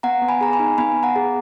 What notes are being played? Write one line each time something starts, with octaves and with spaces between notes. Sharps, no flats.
B3 F#5 A#5
B3
G#5 B5
G#4 A#5
G#5 B5
D#4
B3 G#5 B5
B3
F#5 A#5
G#4